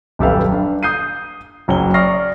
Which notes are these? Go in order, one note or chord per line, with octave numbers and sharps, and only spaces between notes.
D#1 F#2 G4 A4 B4 F5
D4
D#6 G6 C7 D#7
F#1 F#3 C#4 G7
D5 C#6 D#6 F6 A#6 C7